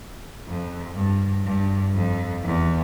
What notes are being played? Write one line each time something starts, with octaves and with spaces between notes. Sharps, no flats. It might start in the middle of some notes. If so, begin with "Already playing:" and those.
F2
G2
G2
F2
E2